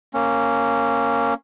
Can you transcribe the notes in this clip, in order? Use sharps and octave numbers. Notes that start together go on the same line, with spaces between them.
A#3 C#4